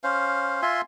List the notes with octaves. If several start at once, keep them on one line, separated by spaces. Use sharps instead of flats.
C#4 C5 F5
F4 E5 G#5 C6